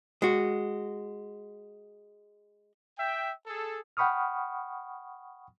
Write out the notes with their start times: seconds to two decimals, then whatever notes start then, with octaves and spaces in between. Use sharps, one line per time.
0.22 G#3 F#4
2.99 E5 G5
3.47 G#4 A4
3.97 F#5 G5 B5 C#6 D#6 F6